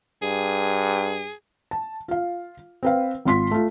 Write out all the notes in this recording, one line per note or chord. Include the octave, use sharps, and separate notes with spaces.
G2 G#4
A5
F4 F5
C4 B4 F5
G#1 F4 C6 B6
A3 F4